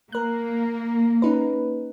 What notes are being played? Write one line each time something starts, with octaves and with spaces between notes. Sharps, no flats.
A#3 A#4 F#6
C#4 D#4 B4